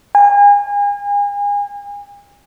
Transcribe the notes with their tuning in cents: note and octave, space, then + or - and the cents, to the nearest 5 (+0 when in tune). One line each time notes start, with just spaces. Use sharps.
G#5 -35